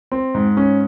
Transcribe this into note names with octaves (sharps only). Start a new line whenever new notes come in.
C4
G#2
C#4